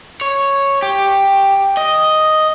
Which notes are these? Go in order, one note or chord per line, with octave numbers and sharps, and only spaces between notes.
C#5
G4
D#5